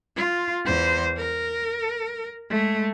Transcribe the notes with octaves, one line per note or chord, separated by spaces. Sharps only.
F4
E2 C5
A#4
G#3 A3